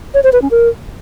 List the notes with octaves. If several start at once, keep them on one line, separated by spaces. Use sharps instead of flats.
C#5
C5
B4
C#4
A#4